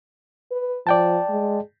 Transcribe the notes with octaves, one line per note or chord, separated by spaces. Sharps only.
B4
F3 D5 G5 A5
G#3